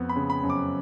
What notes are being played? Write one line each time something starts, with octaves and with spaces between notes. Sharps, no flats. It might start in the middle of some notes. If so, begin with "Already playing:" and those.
Already playing: F2 B3
B5
C#3
B5
F#2
D6